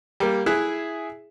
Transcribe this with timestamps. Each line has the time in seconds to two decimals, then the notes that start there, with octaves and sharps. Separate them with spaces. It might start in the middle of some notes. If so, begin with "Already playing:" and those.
0.20 G3 A#3
0.46 E4 G#4 E5 F#6